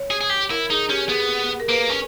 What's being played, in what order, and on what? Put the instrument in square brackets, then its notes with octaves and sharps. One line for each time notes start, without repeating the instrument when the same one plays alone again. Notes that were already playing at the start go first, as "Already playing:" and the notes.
Already playing: [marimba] C#5
[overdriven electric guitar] G#4
G#4
G4
[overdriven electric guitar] E4 [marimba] A#4
[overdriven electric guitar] D#4 [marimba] G#4
[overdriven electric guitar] C#4 [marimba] G4
[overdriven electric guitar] B3 [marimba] G#4
[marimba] A#4
[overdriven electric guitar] A#3 [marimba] B4
[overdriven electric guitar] C#4